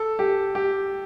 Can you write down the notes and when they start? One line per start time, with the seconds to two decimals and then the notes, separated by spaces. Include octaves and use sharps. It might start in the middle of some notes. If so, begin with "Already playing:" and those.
Already playing: A4
0.19 G4
0.55 G4